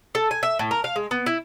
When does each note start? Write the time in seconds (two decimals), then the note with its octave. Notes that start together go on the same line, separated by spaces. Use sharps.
0.15 A4
0.31 G#5
0.43 E5
0.59 A2
0.71 A#4
0.84 F5
0.96 G#3
1.11 B3
1.26 E4